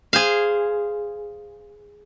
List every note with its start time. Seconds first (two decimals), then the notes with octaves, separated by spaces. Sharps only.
0.13 G#4 C5 F5